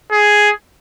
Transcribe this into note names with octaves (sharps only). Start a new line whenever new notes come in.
G#4